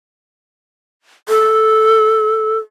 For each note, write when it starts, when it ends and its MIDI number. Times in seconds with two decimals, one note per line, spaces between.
1.29 2.56 69